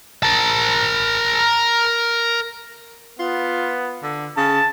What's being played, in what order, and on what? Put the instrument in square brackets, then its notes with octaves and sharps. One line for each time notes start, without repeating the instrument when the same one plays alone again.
[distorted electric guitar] A#4 A5
[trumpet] B3 [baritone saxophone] F4
[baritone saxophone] D3
[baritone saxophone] C#3 [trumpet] A5